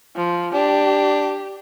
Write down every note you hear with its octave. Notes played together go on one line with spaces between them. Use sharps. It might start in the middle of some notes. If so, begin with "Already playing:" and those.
F3
D4 G4